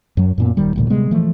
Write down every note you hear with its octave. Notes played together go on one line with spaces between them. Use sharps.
F#2 F#3
F#2 A#2 B3
D#1 D#2 D#3 G3
A1 D2 A#2
C3 G3 G#3 B3
E3 F3 A3